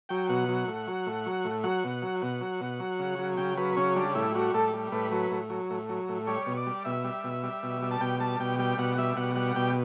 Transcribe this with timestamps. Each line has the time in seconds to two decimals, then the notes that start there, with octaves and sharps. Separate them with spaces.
0.09 F#3 G5
0.29 B2 F#5
0.48 F#3
0.67 A2
0.87 F#3
1.06 A2
1.26 F#3
1.45 A2
1.64 F#3 F#5
1.84 B2
2.02 F#3
2.22 B2 F#5
2.41 F#3
2.61 B2
2.80 F#3
2.99 C#3
3.19 F#3
3.37 C#3 G5
3.57 F#3 B4
3.76 C#3 C#4
3.96 G3 D4
4.15 A2 E4
4.35 G3 F#4
4.54 A2 A4
4.73 G3
4.92 A2 B4
5.11 F#3 B4
5.31 A2
5.50 F#3
5.70 A2
5.89 F#3
6.09 A2
6.27 G3 C#5
6.46 B2
6.57 D5
6.67 G3
6.85 B2 E5
7.04 G3
7.24 B2
7.43 G3
7.63 B2
7.82 G3
7.91 A5
8.01 B2 G5
8.20 G3 A5
8.40 B2 G5
8.59 G3 G5
8.78 B2 F#5
8.98 G3 E5
9.17 B2 F#5
9.36 G3 F#5
9.56 B2 G5